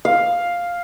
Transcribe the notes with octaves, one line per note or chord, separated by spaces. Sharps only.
F5